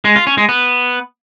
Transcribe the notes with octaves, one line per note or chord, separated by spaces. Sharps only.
G#3
F4
C#4
G#3
B3